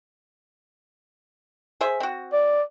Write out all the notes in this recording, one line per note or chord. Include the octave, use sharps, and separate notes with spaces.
G#4 C5 E5
C4 F#4
D5